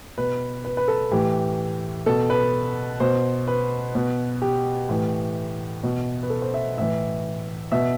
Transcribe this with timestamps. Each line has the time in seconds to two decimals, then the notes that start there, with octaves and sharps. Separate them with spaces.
0.18 B2 B4
0.65 B4
0.77 B4
0.88 A4
1.11 A2 E3 G4
2.06 B2 A4
2.30 B4
3.00 B2 C5
3.47 B4
3.95 B2
4.42 G4
4.89 A2 E3
5.83 B2
6.23 B4
6.30 A4
6.42 C5
6.54 E5
6.77 A2 E3 E5
7.72 B2 E5